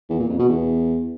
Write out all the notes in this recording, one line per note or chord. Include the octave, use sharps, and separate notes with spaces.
E2
A#2
F2
B2
E2